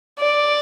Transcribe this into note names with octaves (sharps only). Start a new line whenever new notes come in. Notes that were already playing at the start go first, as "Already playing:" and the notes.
D5